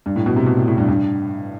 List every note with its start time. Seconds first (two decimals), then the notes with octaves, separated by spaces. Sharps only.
0.06 G2
0.16 A2
0.26 B2
0.36 C3
0.46 B2
0.57 A2
0.68 A2
0.78 G2
0.88 G2